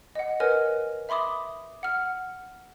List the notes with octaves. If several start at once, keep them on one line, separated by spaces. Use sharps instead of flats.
D#5 F#5
A#4 B4 C#5 D#5 G#5 F6
E5 B5 C6 D6 D#6
F#5 F6